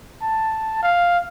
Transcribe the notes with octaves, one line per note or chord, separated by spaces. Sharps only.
A5
F5